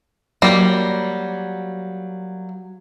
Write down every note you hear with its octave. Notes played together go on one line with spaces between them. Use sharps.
F#3 G3 A#3